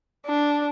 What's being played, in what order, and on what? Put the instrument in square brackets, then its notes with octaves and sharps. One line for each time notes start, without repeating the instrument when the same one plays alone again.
[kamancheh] D4